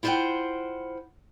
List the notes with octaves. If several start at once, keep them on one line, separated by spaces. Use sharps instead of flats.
E4 F4 C5 D5 F#5 G5